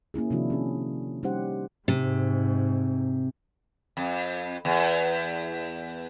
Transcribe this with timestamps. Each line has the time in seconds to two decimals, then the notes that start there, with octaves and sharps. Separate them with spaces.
0.14 A#3 C#4 E4 G#4
0.31 C3 D#3 F3 D4 E4 F#4
0.50 C#4 G#4
1.23 G3 C#4 D#4 G4 C5 F#5
1.88 G#2 C3
3.97 F2
4.65 E2